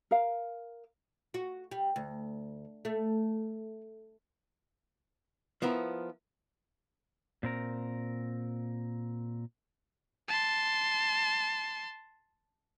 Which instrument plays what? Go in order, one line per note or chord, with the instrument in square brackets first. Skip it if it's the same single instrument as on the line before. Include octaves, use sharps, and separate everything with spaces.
[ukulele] A#4 F5
[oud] F#4
G3
D2
A3
[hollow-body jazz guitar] F3 B3 E4 A#4
[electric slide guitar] A#2 C4 A#4
[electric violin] A5 C6